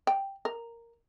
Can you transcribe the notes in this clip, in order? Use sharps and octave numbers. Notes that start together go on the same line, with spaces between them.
G5
A#4